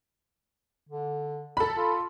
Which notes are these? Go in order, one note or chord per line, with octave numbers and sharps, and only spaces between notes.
D3
A4 B5
F4